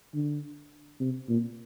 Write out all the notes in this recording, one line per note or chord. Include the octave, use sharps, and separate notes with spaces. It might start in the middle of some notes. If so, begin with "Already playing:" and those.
D3
C3
A#2